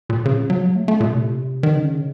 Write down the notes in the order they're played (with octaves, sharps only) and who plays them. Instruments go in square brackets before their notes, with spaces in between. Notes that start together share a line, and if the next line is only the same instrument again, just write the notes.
[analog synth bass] A#2
C#3
F#3
A3
A3
A#2
C3
D#3
C#3